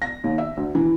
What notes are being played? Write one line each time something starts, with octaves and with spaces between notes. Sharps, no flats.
A#6
D#2
E5
D2
E3